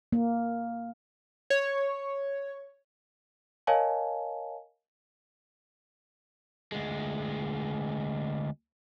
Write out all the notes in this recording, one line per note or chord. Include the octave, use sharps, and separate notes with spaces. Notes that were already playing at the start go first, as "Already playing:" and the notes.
A#3
C#5
A#4 C#5 D#5 F5 G#5 A5
D2 G#3